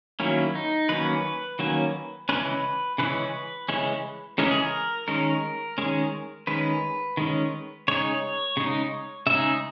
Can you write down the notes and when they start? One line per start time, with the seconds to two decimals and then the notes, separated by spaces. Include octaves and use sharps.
0.20 D#3 F#3 A#3 C#4 E4
0.55 D#4
0.89 D#3 F#3 A#3 C#4 B4
1.59 D#3 F#3 A#3 C#4
2.29 C#3 E3 G#3 C#4 B4
2.98 C#3 E3 G#3 C#4 B4
3.69 C#3 E3 G#3 C#4
4.38 C#3 E3 G#3 C#4 A#4
4.51 G#4
4.63 A#4
5.08 D#3 G#3 C#4 A#4
5.78 D#3 G#3 C#4
6.47 D#3 G#3 C#4 B4
7.17 D#3 G#3 C#4
7.88 C#3 G#3 D#4 C#5
8.57 C#3 G#3 D#4
9.27 C#3 G#3 D#4 E5